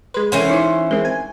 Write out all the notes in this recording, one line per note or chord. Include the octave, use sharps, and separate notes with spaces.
G#3 B4 C6
E3 C#4 A4 A#4 C5 F#5
D#4 E4 C#5
G#3 C4 A#4
G#5